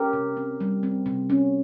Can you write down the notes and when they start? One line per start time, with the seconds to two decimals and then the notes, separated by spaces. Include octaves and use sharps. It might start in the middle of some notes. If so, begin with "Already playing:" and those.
Already playing: C#4 G4 A#4
0.13 C3
0.37 C4
0.60 G3
0.83 C4
1.06 C3
1.30 C#4